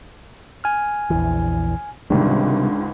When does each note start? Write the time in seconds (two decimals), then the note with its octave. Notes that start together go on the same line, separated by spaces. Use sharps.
0.64 G#5 F6
1.10 A#1 E2 E3
2.10 C#2 G#2 C3 D#3 G3 D4